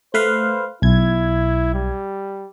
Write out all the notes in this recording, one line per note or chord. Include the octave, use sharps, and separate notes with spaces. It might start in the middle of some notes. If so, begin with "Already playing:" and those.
A3 B4 C5 F5
B1 E4 G#6
G3